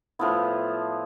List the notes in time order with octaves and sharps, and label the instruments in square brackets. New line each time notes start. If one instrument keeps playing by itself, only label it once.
[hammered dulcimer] A2 F3 B3 E4